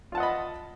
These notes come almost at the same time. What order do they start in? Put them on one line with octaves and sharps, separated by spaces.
F4 A5 F#5 D#5 B5